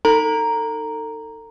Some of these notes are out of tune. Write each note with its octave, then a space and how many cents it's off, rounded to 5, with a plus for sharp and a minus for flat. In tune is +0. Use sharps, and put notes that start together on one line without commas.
D#4 +0 A4 +35 A#5 +0